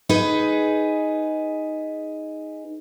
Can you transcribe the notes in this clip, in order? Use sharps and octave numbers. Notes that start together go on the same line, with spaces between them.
D#4 G#4 B4